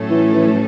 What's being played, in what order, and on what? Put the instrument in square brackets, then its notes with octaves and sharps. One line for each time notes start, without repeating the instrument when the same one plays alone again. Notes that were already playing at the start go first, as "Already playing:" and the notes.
Already playing: [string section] A2 F#3 A3 C#4 A4
[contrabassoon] E3
E3